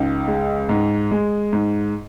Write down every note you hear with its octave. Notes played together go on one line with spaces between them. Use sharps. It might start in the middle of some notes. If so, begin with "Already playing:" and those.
Already playing: C#2 D#4
G#3
G#2
G#3
G#2